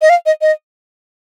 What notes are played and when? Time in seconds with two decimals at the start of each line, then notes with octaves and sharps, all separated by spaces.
0.02 D#5
0.10 F5
0.26 D#5
0.41 D#5